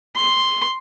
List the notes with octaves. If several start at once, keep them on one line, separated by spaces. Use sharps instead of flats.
C6